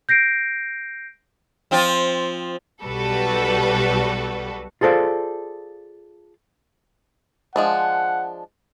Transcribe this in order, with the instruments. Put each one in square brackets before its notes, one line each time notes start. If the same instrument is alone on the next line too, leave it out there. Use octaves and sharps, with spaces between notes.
[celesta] G6 A#6 C7 D7
[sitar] F3 C4 F4
[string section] B1 G3 F#4 A4 B4
[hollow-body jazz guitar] F4 G#4 A4 C5 D5 F5
[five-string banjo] F3 G#3 D4 [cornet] F#5